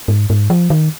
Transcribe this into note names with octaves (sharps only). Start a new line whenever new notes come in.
G#2
G#2
F3
D#3